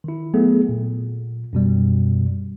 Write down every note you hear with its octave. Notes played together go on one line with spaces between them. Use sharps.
D#3 E4
F#3 A3 B3 G#4 A4
A#2
F#2 B2 G3